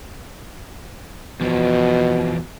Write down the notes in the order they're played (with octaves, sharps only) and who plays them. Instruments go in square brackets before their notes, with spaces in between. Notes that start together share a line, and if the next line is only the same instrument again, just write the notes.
[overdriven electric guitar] E2 F3 [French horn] B2